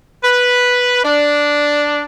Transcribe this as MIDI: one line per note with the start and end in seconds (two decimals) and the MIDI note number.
0.23 0.99 71
1.03 2.03 62